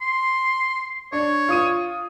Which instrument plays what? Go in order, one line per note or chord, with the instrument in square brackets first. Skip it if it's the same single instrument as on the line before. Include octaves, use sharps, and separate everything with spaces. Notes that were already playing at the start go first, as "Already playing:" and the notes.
[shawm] C6
[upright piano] D4 [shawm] C#5
[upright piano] F4 D#6 D#7